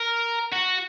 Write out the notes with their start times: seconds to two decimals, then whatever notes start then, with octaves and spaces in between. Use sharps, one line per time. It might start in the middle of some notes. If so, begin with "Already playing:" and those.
Already playing: A#4
0.53 F#4